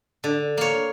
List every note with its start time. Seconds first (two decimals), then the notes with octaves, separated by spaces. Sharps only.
0.24 D3
0.58 A#3 C#5